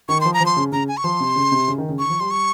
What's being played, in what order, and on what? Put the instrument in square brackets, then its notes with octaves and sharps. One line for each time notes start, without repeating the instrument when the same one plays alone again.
[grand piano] D#3 [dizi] C#6
[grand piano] F3 [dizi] C6
[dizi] A#5
[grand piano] F3
[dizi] C6
[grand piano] C#3
[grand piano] C#3 [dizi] A#5
[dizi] G#5
C#6
[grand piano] F3 [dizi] C6
[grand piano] C3
C#3
C3
C#3
D#3
C#3
[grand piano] D#3 [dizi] C#6
[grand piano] F3
[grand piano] G3 [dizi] C6
[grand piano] G3 [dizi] C#6